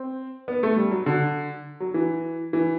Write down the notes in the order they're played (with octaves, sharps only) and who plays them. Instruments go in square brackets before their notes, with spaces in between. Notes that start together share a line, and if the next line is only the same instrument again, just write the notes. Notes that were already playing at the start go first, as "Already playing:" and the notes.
Already playing: [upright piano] C4
B3
A3
G3
F#3
D3
F#3
E3
E3